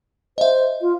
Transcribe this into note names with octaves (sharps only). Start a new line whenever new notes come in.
C5 D#5 E5
F4